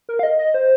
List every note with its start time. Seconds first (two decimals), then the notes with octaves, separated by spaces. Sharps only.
0.09 A#4
0.19 F5
0.23 D#5
0.39 D#5
0.54 C5